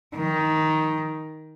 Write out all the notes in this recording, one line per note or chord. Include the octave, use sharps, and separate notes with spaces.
D#3